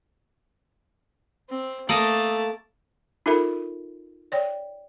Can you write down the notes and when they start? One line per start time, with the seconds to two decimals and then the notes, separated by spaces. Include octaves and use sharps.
1.49 C4
1.89 A3 A#3 A4 D#5 A5
3.26 D#4 F4 A4 A#4 E5 B5
4.32 C#5 D5 G5